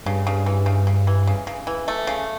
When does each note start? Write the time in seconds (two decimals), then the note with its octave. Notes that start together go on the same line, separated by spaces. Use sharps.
0.06 G2 C#3
0.27 C#3
0.46 E3
0.66 C#3
0.87 C#3
1.07 E3
1.27 C#3
1.47 C#3
1.67 E3
1.88 A3
2.07 C#3